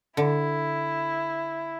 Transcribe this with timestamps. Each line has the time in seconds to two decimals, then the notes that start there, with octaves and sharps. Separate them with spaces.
0.17 D3 E4